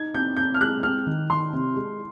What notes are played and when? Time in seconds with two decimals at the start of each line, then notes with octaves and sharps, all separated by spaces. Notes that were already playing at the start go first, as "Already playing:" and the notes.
Already playing: D#4 G#6
0.14 C4 G6
0.36 C4 G6
0.54 F6
0.61 G#3 F#6
0.83 C4 F6
1.07 D#3
1.30 D#3 C6
1.53 C3
1.76 G#3